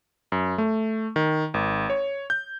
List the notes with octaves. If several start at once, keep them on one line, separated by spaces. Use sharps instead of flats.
F#2
A3
D#3
G#1
C#5
G6